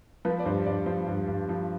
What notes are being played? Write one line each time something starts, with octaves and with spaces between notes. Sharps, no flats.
F3 B4
D5
G2 C5
G2 D5
F3 C5
G2
G2
F3